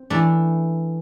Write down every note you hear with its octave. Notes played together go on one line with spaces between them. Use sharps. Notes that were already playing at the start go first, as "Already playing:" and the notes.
Already playing: C4
E3 A3 D4